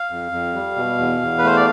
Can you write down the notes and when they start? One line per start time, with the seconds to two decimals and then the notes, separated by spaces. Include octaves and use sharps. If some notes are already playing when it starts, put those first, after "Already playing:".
Already playing: F5
0.10 F2
0.32 F2
0.54 G3
0.76 B2
0.98 E2
1.22 E2
1.38 B4
1.44 A3 C5
1.57 D5